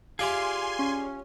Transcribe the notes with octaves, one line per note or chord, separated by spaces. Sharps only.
F4 G4 G#4 D5 E5 F5 G#5 C6
C#4